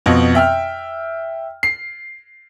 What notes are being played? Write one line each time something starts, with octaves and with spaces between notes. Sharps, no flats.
F2 B2
E5 G5 F6
C7